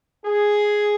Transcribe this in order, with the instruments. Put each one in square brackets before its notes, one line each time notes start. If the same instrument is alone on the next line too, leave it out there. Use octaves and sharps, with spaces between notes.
[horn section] G#4